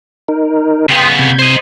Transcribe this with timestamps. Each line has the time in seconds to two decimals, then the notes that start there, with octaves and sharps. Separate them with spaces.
0.28 D#4 A#4
0.89 C#3 B3 G5 C6 D#6
1.19 C3 G6 G#6
1.39 C5 D#5